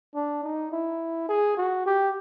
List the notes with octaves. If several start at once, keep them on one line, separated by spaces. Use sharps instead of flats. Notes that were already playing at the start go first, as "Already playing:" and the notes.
D4
D#4
E4
G#4
F#4
G4